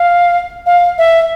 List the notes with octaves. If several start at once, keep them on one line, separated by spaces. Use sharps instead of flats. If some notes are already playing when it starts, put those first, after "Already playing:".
Already playing: F5
F5
E5